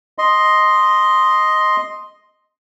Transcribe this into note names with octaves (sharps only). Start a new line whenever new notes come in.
D#5 C6